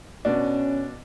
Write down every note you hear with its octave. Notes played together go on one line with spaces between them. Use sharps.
B2 C#4 D4